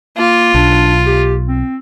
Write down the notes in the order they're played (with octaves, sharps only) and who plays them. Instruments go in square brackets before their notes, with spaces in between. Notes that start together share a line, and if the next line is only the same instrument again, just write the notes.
[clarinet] A#3 [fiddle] F4
[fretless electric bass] B1 [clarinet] D4
[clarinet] G4
C4